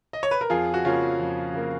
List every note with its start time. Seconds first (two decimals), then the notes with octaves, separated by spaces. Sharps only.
0.13 D#5
0.23 C#5
0.31 B4
0.41 A#4
0.50 F2 F4 G#4
0.74 F#4
0.85 C#3 F3 A#3 C#4 F4
1.19 F2
1.53 C#3 F3 A#3